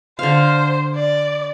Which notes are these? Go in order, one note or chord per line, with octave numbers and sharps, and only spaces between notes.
D3 C5 F5
D5